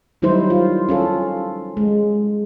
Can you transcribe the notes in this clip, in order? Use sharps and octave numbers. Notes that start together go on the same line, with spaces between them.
D#3 F#3 G3 D#4 E4 C5
F4
C#4 F4 A4
G#3